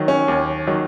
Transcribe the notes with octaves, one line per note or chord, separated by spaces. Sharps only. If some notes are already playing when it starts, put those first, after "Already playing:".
Already playing: D#3 F#3
C#4
D#2
D#3 F#3